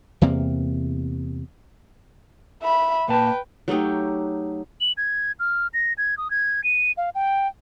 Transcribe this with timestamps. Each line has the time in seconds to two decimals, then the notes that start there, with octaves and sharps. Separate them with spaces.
0.21 E2 C3 A#3
2.62 E5 B5
3.09 A#2 B4 G5 A5
3.68 F#3 A3 D#4 G4
4.81 F#7
4.97 G#6
5.39 F6
5.74 A#6
5.98 G#6
6.18 D#6
6.31 G#6
6.64 D#7
6.97 F5
7.15 G5